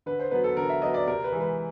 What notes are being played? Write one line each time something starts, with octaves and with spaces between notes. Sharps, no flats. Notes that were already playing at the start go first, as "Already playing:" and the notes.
D3 B4
C5
F#3 B3 B4
A4
D3 A#4
E5
F#3 B3 D#5
D5
C3 A#4
B4
E3 G#3
B4